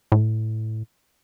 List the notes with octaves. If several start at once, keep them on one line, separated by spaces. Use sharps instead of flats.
A2